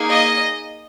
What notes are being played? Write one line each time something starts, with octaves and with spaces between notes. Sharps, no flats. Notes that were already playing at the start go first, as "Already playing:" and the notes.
Already playing: A#3 D#4 G#4
D#5